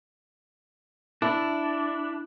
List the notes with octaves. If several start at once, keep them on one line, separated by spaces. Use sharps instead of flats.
D4 E4